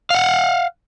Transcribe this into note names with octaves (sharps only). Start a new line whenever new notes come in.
F5 F#5